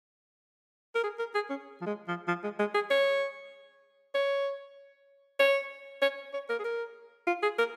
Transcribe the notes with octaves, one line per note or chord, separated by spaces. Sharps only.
A#4
G#4
A#4
G#4
C#4
F3
G#3
F3
F3
G#3
G#3
G#4
C#5
C#5
C#5
C#5
C#5
A#4
G#4
A#4
F4
G#4
A#4